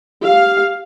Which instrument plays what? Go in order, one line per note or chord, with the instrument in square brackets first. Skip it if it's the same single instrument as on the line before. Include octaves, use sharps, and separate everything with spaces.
[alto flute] G4 [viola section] F5